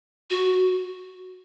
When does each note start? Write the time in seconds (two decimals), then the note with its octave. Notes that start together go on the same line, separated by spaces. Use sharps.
0.30 F#4